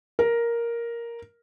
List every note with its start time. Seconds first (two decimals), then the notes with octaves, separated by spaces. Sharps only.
0.19 A#4